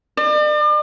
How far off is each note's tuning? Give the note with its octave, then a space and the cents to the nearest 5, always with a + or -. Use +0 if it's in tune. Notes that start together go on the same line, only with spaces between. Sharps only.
D5 +40